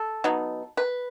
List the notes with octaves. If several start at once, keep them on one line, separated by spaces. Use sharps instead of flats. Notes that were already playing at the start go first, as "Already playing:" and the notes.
Already playing: A4
F#3 B3 D#4
B4